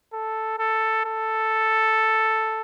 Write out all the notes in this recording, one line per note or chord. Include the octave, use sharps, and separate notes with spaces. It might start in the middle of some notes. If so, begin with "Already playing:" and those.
A4
A4
A4